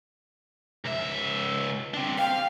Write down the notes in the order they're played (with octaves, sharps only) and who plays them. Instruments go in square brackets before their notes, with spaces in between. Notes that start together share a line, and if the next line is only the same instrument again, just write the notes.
[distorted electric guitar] C#2 E5
C4 D4
[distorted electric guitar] F5 [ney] G5